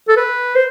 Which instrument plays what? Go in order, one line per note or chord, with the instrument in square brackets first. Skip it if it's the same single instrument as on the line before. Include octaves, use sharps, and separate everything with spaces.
[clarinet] A4
B4
C5